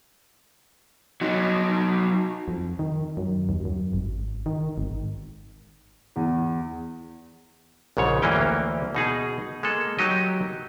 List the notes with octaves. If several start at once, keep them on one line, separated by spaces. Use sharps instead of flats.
F#3 D#4
F2
D#3
F#2
D#2
F#2
G#1
D#3
G#1
E2
A#1 G#2 C#3 C#5
D2 E3 A#3 C#4 G5
B2 D#4 G#4
G#3 A#3 A4
F#3 D#4 G4 D#5